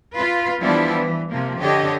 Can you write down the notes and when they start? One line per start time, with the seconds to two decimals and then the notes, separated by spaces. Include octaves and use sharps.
0.14 F4 B4
0.61 E3 F3 G3 B3 D4 E4
0.94 E3
1.30 C3 F3 A#3
1.61 D3 G4 C#5 D#5